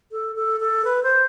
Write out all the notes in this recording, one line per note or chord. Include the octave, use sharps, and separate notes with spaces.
A4
A4
A4
B4
C5